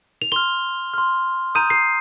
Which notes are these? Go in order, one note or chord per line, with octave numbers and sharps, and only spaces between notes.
F7
C6 F6 G7
C6 F6
A#5 D#6 G6 D#7
C7